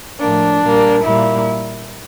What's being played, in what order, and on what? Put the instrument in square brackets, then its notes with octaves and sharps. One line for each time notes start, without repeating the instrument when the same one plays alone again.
[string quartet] A2 F3 A#3 D4
A#2 G3 A#3
A#2 G3 A#3 E4